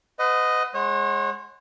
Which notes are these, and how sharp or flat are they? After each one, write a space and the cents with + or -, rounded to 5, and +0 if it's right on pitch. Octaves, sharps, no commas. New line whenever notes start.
B4 +40 D#5 +0 F#5 -20
G#3 +0 C#5 -40 F#5 +0